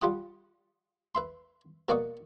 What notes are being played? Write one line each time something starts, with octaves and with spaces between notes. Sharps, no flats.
G3 F4 F#5 D#6
B4 E5 C6
B2 A#3 D5 F#5 C#6 D#6